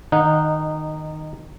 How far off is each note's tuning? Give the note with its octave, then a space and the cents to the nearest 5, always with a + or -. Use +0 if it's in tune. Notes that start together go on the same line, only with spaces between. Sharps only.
D#3 +0 D#4 -15 F#5 -25